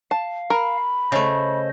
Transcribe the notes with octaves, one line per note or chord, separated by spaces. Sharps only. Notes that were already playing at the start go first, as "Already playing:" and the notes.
F5 A5
A#4 B5
C#3 A3 C5 D#5